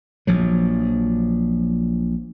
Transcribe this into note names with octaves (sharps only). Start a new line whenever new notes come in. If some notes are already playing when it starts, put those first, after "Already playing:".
A#1 F3 F#3